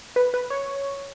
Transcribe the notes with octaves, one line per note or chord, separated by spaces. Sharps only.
B4
B4
C#5